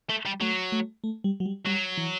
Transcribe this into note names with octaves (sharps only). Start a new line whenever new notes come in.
A3
G3
F#3 A3
A3
A3
G3
F#3
G3
F#3 G3
E3